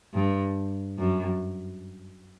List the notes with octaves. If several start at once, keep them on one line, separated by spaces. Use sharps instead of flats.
G2
F#2